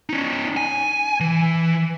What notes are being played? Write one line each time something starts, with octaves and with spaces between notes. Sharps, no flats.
C#4 D#4
G#5
E3